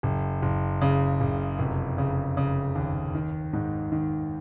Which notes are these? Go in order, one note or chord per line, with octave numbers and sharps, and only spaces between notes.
F#1
F#1
C#3
F#1
F1
C#3
C#3
D#2
D#3
G#2
D#3